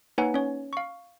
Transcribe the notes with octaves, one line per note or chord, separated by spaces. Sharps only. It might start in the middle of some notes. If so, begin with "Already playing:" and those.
A#3 D#4 B4 C#5 F#5 G#5
C#4 C#5
F5 C#6